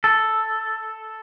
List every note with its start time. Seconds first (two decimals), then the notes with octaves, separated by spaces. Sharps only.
0.04 A4